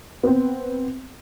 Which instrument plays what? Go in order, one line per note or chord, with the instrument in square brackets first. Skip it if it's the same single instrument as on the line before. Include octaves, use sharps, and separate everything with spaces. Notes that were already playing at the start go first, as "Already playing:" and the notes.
[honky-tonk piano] B3 C4